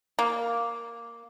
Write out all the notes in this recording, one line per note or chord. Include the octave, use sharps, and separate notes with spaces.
A#3